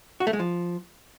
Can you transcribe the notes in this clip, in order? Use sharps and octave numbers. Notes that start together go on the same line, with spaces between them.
F#4
A3
G#3
F3